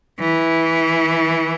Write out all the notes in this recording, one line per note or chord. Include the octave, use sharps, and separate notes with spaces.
E3